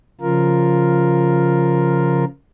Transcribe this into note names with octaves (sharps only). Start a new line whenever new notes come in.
C#3 F3 F4 A#4